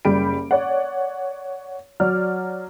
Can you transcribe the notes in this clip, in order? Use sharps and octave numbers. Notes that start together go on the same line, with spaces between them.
F#1 G3 G4 B5 D7
C#5 D5 F#5
F#3 D5 F6